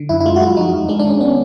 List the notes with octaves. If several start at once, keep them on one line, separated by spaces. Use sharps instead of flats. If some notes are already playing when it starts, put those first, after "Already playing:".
Already playing: D3
F#2 E4
E4
G#3 F4
F#4
G#3 F4
E4
F3 D#4
F2
G#3 D4
D4
D#3
C#4
B3 C#4